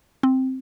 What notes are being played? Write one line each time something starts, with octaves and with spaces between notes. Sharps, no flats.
C4